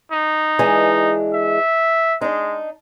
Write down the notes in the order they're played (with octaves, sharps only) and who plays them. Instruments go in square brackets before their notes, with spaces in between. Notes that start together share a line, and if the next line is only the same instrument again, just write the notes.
[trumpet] D#4
[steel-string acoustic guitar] E3 G#3 D4
[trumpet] E5
[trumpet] G#3 [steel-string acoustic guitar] D4 D#4